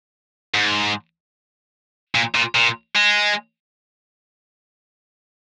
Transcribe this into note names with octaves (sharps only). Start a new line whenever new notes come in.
G#2
A#2
A#2
A#2
G#3